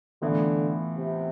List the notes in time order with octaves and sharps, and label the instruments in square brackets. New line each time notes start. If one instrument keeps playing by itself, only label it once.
[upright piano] A2 E3 B3 F4 [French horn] D3
[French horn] C3